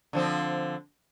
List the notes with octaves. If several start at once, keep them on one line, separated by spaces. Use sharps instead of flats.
D3 F3 C4